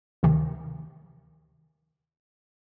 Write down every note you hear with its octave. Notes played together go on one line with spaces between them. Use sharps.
D2 C3 D#3